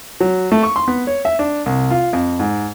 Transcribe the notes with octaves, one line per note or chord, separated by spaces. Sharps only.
F#3
A3
C#6
C6
B3
C#5
E5
D4
C2
F4
F2
G#2